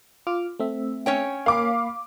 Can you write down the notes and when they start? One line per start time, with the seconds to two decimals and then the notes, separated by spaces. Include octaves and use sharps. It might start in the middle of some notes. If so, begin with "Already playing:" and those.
0.27 F4 D6 F6
0.59 A3 C4 E5
1.06 C#4 C#5 G5
1.46 A#3 F5 B5 D6